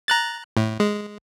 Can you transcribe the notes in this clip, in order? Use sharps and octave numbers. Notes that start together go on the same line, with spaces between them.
A#5 F#6 A6
A2
G#3